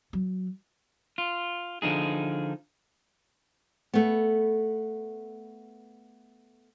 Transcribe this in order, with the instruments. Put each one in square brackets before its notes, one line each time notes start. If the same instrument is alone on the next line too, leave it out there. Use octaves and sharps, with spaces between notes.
[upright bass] F#3
[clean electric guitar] F4
D3 F3 D#4 G#4
[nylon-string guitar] A3 B3